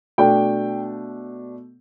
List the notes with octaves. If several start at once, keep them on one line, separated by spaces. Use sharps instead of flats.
B2 A3 D4 G5